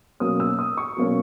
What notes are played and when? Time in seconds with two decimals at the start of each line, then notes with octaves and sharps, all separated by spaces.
0.20 B2 F#3 A#3 C#4 D#6
0.40 E6
0.59 D#6
0.77 C#6
0.97 B2 F#3 A#3 C#4